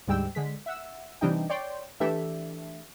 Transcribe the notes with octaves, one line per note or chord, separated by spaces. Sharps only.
D2 G#2 G3 G5 E6
D3 G#3 B6
E5 F#5 E6
C3 E3 G3 D4 D#4 G5
C#5 D5 G5 C6 G6
E3 A3 D4 G4 A4 E5